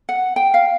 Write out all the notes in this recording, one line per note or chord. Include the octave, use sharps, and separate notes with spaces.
F#5
G5
F5